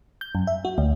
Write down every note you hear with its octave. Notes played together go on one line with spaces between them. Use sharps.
G6
F#2
E5
F#4
D2